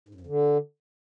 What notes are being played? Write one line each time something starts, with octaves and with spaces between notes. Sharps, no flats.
G#2
F#2
F2
D3